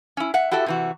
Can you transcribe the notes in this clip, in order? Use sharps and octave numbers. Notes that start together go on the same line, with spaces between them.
C#4 E4
E5 F#5
E4 F#4 G4 A4 E5
C3 E3 F#4